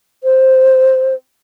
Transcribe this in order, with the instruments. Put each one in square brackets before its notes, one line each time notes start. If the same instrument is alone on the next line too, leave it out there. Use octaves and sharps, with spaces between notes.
[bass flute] C5